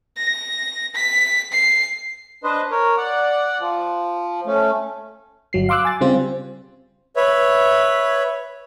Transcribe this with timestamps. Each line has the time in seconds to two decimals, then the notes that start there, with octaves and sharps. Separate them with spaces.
0.17 A#6
0.95 B6
1.52 C7
2.44 D4 B4 C5 D#5
2.71 A#4 C#5
2.97 D5 F#5
3.60 F3
4.46 A3 C#4
5.53 G1 F#3 C7
5.69 F5 C6 D6 E6 F#6
5.85 G#5 A6
6.01 C#3 G3 C4 F4 C5
7.16 B4 C#5 E5